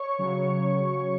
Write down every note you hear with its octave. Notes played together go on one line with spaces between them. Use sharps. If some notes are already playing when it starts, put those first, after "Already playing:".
Already playing: C#5 C#6
C#3 F#3